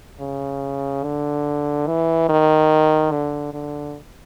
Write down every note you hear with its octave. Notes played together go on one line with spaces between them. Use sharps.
C#3
D3
E3
D#3
D3
D3